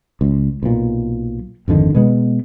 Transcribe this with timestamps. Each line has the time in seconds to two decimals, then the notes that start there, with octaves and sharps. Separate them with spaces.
0.21 C#2
0.63 B1 A#2
1.68 G#1 F2 D3 D#3
1.95 B2 G#3 B3